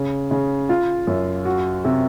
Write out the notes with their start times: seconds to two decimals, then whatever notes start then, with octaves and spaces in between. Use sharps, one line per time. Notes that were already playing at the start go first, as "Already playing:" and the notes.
Already playing: C#3
0.31 C#3
0.69 F4
1.07 F#2
1.45 F#4
1.84 C3